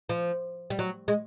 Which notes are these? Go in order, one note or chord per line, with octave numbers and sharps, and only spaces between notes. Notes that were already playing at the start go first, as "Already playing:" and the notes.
F3
G3
F#3
G#3